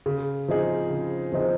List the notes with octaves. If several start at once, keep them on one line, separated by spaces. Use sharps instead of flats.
C#3
F3 C4 D#4 G#4
C#3
F3 C4 D#4 G#4